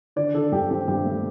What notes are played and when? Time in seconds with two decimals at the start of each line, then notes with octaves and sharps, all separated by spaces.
0.16 D3 D5
0.34 D3 A4
0.52 G2 G4
0.70 C4 G4
0.88 G2 G4
1.06 A3